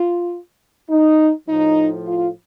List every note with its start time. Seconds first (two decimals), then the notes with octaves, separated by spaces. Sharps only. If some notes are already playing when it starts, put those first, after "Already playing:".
Already playing: F4
0.90 D#4
1.48 A2 F3 D#4
2.07 F4